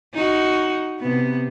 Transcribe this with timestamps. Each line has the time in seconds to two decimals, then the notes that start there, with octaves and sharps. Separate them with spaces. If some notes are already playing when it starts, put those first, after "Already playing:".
0.14 D#4 F#4
1.00 C3 B3